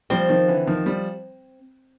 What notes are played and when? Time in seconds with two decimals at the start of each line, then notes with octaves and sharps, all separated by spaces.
0.10 F3 G3 C4
0.29 D#3 F3
0.48 D3 E3
0.67 D#3 F3
0.86 F3 G3